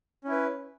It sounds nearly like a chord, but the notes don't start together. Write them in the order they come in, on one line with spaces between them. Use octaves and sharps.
C#4 E4 B4